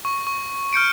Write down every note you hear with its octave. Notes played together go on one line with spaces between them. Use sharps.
C#6
C#6
F6 G6 C#7 D7